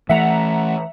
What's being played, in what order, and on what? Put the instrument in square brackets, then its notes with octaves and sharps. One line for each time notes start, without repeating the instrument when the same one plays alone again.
[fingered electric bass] E3 A3 [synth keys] E5 F#5 A#5